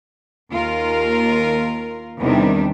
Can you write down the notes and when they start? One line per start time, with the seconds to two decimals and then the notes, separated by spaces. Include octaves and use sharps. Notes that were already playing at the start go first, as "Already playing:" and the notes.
0.52 D#2 F4 A#4
2.20 E2 C3 D#3 G3 D4